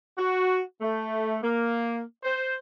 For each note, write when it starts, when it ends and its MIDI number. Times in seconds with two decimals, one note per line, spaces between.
0.17 0.59 66
0.81 1.37 57
1.42 2.00 58
2.24 2.55 72